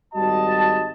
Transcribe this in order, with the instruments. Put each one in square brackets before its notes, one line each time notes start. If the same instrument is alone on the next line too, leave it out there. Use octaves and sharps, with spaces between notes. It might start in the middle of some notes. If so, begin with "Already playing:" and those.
[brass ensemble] G#1 G3 F#4 D#5 A5